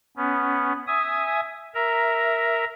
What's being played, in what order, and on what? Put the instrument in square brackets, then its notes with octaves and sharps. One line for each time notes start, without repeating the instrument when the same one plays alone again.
[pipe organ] B3 C#4
E5 G#5 D#6
A#4 E5 A#5